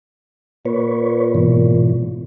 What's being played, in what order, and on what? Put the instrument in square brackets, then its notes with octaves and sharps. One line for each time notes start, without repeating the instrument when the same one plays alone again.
[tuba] A#2 [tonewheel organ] B4 C#5
[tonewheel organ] G#2 B2 E3